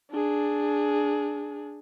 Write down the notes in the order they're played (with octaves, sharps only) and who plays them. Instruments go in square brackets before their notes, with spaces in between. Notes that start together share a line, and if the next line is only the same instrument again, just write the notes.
[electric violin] D4 G#4